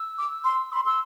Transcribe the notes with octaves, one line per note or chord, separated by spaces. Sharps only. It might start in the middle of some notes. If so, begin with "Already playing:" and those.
Already playing: E6
D6
C6
B5 C6
C6 E6